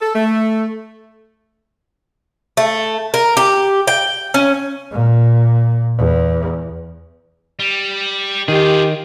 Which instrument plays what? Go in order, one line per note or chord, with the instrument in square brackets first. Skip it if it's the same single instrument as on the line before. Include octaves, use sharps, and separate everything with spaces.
[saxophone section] A4
A3
[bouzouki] A3
A#4
G4
G5
C#4
[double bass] A#2
E2
[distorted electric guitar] G3
[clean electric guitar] D#3 [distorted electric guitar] F4 G#4 [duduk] G4